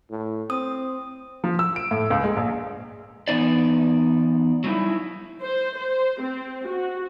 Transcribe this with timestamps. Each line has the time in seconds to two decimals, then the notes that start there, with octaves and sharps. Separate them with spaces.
0.10 A2
0.50 C4 D#6
1.44 F3
1.59 E6
1.76 D7
1.91 A2
2.10 C#2
2.24 G#3
2.36 A#1
3.28 E3 B3 D#4 D5
4.64 F#3 G3 D#4 E4
5.42 C5
5.78 C5
6.21 C4
6.67 F#4